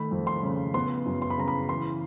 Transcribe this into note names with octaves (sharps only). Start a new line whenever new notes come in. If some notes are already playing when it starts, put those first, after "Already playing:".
Already playing: D#3 A3 B5
F2
C6
C#3
B3 C6
F#2
C6
B5
C#3 A#5
B5
E3 C6